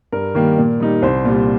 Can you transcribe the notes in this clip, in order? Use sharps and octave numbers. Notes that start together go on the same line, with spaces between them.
G2 A#4
D#3 G3 A#3
A#2
G3 D#4
C2 C5
A#2 G3